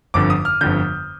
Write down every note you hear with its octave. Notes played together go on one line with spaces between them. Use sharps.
G1 F2 D3 D6
D#6
F6
G1 F2 D3 G6